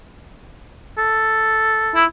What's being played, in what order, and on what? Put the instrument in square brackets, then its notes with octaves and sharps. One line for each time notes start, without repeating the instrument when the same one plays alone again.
[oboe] A4
[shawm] E4